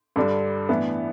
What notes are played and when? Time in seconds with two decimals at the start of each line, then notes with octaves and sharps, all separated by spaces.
0.16 G2 D3 G3 D4
0.69 A2 E3 B3 D4